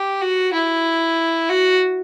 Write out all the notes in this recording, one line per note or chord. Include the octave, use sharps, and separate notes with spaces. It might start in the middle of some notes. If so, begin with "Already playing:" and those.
Already playing: G4
F#4
E4
F#4